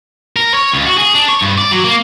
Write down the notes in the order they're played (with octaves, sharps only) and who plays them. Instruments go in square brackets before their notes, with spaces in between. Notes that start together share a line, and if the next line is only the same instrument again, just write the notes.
[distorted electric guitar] A#4
C#5
C#2
F#4
G#4
D4
C#5
G2
D5
F#3
A#3